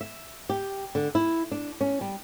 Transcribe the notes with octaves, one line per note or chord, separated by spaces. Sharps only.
E5
G4
D3
E4
D4
C#4
G3